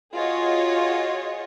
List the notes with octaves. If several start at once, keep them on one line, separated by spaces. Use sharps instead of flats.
F4 F#4 G#4 C#5 D#5